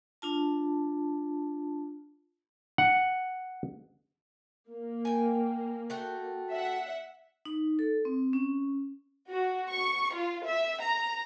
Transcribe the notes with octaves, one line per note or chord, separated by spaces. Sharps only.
D4 F4 A5
F#5
A#3
G5 G#5
A3 F#4 G5
E5 F#5
D#4
A4
C4
C#4
F#4
C#6
F4
E5
A#5